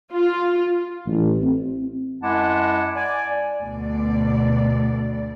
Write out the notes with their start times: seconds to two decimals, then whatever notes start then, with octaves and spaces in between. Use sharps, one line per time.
0.14 F4
1.05 A1
1.42 C4
2.22 F#2 G#3 E4 F#5 A5 D6
2.95 D5 G#5
3.62 D2 B2 D5